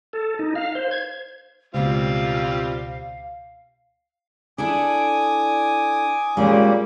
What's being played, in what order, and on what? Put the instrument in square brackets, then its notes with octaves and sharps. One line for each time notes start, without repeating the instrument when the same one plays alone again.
[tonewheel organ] A4
D#4
F5
C5
G#6
[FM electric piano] C#2 B2 [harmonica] G3 C4 F4 [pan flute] F5
[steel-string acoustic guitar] D4 E4 A4 [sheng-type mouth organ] G#5 D6 D#6
[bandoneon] A#2 G3 A#3 [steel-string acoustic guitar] G#3 C#4